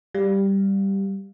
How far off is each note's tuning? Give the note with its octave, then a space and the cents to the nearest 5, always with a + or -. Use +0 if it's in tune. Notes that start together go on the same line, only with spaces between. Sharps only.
G3 +0 F5 +0